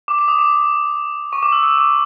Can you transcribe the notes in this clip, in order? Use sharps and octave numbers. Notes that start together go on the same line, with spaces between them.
D6
D6
D#6
D6
C#6
D6
E6
E6
D6